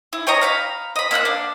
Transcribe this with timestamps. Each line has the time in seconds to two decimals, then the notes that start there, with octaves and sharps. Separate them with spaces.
0.13 E4
0.27 G4 C#5 D#5 A#5
0.41 F5 A#5 B5
0.96 D#5 B5
1.11 A#3 E5 F#5 F#6
1.25 D4